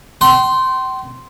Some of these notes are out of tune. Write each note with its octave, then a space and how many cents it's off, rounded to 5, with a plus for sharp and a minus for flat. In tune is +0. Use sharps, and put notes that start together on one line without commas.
G5 -40 C6 +0